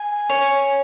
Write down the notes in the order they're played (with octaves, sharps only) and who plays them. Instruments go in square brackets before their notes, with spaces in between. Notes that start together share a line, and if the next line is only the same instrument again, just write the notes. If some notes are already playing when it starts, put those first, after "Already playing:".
Already playing: [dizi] G#5
[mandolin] C#5